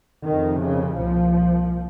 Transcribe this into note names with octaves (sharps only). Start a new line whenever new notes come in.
F2 C3 D#3
C#3
C2 A#2 F3